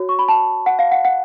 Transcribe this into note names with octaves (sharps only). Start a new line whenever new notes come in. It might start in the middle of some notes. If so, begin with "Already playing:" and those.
Already playing: F#4 C#5
C#6
B5
A5
F#5
F5
F#5
F#5